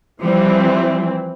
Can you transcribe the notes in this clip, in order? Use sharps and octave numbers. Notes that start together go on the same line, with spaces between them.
E3 F3 G3 C4